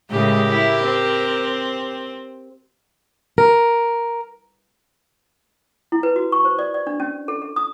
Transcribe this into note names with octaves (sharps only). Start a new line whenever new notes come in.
A2 C#3 G#3 G4 A#4
E4
C4
A#4
E4
B4
F#4
C#6
C5
D5
D5
D4
C#4
A4
A4
D#6